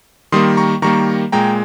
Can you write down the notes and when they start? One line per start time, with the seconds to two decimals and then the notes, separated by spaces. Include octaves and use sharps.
0.32 D#3 G3 A#3 C6 D#6
0.57 A#5 C#6
0.82 D#3 G3 A#3 A#5 C#6
1.32 A#2 G#3 G5 A#5